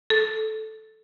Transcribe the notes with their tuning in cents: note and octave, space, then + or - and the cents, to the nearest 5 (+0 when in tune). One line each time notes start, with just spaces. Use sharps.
A4 -10